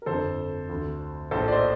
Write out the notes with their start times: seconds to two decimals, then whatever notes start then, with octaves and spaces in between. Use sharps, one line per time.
0.02 A#4
0.06 G1 F2 D3 A4 C5
0.69 D2 D3
1.31 A#1 A2 A4 C5
1.48 D5
1.52 C5 D#5